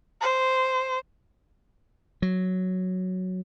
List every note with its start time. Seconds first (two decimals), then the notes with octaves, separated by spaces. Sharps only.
0.21 C5
2.22 F#3